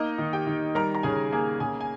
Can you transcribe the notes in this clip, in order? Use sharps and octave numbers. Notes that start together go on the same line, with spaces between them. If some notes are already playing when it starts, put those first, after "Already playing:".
Already playing: A#3 D#4 D#5
D#3
G4 G5
D#3
G3 A#4 A#5
A#5
C#3 G#4 G#5
A#3 G#4 G#5
C#3 G#4 G#5
G#5